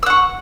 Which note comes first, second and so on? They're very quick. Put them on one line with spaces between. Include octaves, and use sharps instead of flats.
E6 F#5 C#6